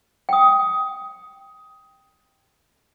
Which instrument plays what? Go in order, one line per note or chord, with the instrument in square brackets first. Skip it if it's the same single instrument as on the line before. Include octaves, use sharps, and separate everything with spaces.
[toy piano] G5 D#6